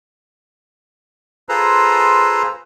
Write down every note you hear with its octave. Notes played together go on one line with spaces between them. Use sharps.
F4 G#4 A4 B4 C5 A#5